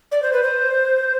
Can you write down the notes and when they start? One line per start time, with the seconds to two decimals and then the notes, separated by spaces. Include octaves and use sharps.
0.12 D5
0.22 C5
0.33 B4
0.43 C5